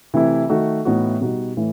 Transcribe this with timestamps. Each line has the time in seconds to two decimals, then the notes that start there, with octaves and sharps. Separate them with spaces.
0.14 C3 E3 A3 E4
0.49 D#3 A3 D#4 F#4
0.85 A2 E3 B3 D#4 F#4
1.21 B2 G3 D#4 F#4
1.57 A2 E3 A3